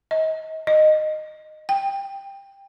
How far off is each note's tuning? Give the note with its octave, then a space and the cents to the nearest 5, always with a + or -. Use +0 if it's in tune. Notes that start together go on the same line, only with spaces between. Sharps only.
D#5 +30
D#5 -15
G5 +15